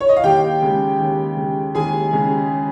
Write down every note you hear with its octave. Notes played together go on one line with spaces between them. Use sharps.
C#5
D#5
F5
D#2 G4 G5
C#3 G#3
D#2
C#3 G#3
D#2 G#4 G#5
C#3 G#3